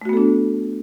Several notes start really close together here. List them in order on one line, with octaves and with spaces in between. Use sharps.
A3 F#4 B3 A4 D4